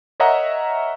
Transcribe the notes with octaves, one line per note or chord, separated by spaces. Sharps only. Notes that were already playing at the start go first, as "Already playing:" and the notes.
A#4 C#5 D#5 E5 F#5 A#5